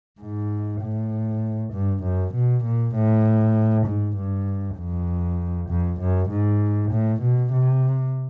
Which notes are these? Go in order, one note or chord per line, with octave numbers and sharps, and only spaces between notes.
G#2
A2
G2
F#2
B2
A#2
A2
G#2
G2
F2
F2
F#2
G#2
A2
B2
C3